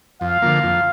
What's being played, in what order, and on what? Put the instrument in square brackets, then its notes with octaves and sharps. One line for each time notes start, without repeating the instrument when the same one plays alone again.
[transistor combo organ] F2 [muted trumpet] F5
[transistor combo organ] D3 F3 A#3
F2